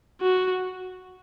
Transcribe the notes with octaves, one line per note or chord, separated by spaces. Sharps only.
F#4